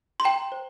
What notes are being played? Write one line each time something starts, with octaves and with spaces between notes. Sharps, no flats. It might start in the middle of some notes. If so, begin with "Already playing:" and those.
C6
G5 A#5
C5